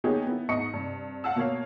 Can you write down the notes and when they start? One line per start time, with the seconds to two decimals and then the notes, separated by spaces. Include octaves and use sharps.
0.04 A#3 B3 D#4 G4 G#4 C#5
0.27 B3 E4
0.49 G#2 B3 D#5 C#6 C#7
0.74 G2 C3
1.24 F5 F#5 A5 E6
1.36 B2 A#3 C#5 F5